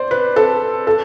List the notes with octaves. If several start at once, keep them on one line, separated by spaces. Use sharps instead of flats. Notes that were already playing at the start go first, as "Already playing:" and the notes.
Already playing: C5 D5
B4
A4
A4